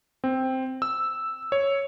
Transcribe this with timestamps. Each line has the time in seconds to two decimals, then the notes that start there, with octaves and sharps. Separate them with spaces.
0.24 C4
0.82 E6
1.52 C#5